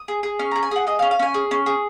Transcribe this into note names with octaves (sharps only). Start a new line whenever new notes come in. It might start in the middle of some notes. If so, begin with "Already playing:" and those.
Already playing: D#6
G#4
G#4
C#4 F6
G#4 A#5
G#5
G#4 F#5
G#4 D#5
F5
C#4
F5
C#4 G#5
G#4
C#4
G#4